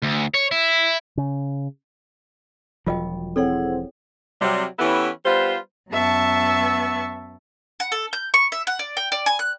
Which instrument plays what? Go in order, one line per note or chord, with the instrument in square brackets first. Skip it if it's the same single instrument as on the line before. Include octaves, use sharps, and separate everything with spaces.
[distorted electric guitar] D2
C#5
E4
[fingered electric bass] C#3
[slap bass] E1 F3 F#3 [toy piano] F4 D#5 G5
[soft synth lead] C4 [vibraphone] E4 G#4 F#5 [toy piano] A4 C#5 G5
[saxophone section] C3 F#3 G3
E3 B3 C#4 E4 G4 A4
G3 B3 F4 B4 C5
[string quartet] F#2 B3 E5 A5 C#6
[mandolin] F#5
A4
G6
C#6
E5
F#5
D5
G5
D5
G#5
F#6